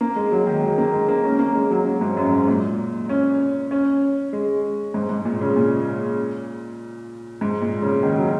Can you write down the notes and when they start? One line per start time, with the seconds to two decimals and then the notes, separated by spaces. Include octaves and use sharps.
0.01 A#3
0.16 G#3
0.32 F#3
0.47 D#3
0.62 G#3
0.78 A#3
0.94 G#3
1.08 A#3
1.24 C#4
1.39 A#3
1.55 G#3
1.71 F#3
1.85 F#3
2.01 G#2
2.17 F#2
2.33 G#2
2.48 A#2
3.09 C#4
3.71 C#4
4.33 G#3
4.94 G#2
5.09 G#2
5.25 A#2
5.41 C#3
5.56 A#2
7.41 G#2
7.61 A#2
7.82 C#3
8.03 D#3
8.18 F#3